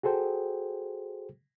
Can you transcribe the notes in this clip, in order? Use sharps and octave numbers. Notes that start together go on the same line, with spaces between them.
F#4 G#4 A4 C5 G5